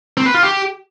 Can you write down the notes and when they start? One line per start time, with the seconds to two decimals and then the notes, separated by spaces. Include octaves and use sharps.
0.17 C4
0.26 B4
0.34 F4
0.43 G4